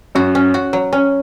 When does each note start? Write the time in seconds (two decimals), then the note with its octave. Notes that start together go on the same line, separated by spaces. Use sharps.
0.15 F#2 F#4
0.35 C#4
0.54 F#4
0.73 F#3
0.93 C#4